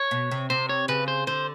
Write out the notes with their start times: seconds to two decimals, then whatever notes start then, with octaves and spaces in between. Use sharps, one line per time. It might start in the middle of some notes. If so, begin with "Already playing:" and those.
Already playing: C#5
0.11 B2
0.31 C3
0.50 C3 C5
0.69 C#5
0.88 C#3 B4
1.08 C5
1.27 D3 C5